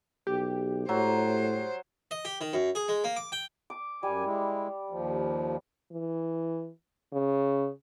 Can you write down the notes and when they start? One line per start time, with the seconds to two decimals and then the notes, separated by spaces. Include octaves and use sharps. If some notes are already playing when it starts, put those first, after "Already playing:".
0.27 B1 G4
0.89 A2 F#3 C5
2.11 D#5
2.25 G4
2.41 D#3
2.53 F#2
2.75 G#4
2.88 G#3
3.04 A#3
3.17 D6
3.32 G5
3.70 D6
4.03 F#2 G3 G#5
4.25 G#3 E4
4.90 D#2 F3
5.92 E3
7.13 C#3